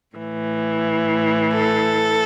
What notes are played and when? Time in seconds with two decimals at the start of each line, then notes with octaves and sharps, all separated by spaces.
0.15 A2 E3
1.53 A4